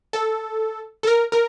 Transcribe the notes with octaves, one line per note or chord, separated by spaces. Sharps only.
A4
A4
A#4
A#4